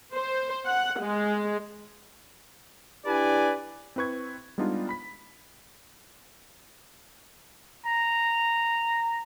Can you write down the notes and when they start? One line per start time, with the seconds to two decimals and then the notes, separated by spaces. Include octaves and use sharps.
0.14 C5
0.66 F#5
1.01 G#3
3.06 D4 E4 G4 B4 D5 G#5
3.96 C4 E4 B4 C#6 G#6
4.58 G3 G#3 B3 D4 D#4 F4
4.89 B5 B6
7.85 A#5